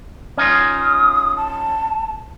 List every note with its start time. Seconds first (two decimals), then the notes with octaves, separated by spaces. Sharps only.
0.37 C#4 D#4 F4 D#6
1.36 A5